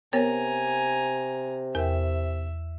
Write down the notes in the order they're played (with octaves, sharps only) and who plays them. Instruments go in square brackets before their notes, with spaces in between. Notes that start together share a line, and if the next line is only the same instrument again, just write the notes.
[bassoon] C3 [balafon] B3 C#5 [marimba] A#4 [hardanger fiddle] G#5 A#5
[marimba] E2 G5 [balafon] A#4 [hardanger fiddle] E5